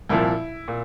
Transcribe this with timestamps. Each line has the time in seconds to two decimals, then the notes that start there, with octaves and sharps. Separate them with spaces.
0.09 C2 A#2 F3 E4
0.68 A#2